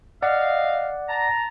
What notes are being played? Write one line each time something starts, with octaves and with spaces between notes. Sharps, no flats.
D5 D#5 F5 F#5
A5 A#5